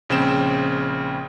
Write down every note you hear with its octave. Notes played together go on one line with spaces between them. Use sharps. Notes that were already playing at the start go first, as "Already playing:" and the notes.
A#1 C#3 C4 G5 E7